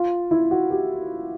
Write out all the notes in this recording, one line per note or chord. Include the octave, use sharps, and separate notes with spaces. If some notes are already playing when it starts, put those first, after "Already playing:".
Already playing: F4
E4
F#4
G4